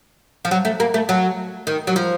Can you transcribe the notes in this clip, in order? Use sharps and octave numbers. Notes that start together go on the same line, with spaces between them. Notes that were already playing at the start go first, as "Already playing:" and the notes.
F3
F#3
A3
A#3
A3
F#3
D#3
F#3
F3